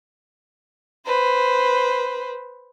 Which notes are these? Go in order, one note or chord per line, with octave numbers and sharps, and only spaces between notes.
B4 C5